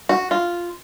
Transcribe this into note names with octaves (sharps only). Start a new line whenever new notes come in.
F#4
F4